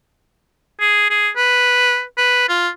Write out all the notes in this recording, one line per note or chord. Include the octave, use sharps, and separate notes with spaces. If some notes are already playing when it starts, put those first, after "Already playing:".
G#4
G#4
B4
B4
F4